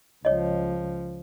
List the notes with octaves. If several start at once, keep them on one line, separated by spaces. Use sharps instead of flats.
C#2 F3 C#5 D#5